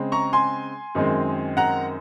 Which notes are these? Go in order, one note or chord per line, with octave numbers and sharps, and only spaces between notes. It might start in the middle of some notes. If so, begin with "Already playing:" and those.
Already playing: C#3 G#3 C4
A#5 C#6
G#5 C6
F#2 D#3 G#3 C4
F#5 A#5